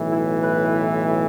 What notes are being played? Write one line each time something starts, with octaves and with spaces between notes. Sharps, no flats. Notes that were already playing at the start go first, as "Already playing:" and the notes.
Already playing: B1 A2 E3
E4
B4